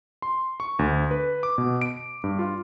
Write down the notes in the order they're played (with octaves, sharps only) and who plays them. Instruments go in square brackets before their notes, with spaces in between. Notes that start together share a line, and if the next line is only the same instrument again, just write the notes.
[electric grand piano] C6
C#6
D2
B4
D6
B2
D7
G2
F4